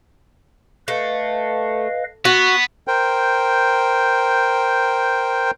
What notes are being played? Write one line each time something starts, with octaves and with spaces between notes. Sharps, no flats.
A3 B4 D#5 F5
B3 F#4
A#4 C5 G5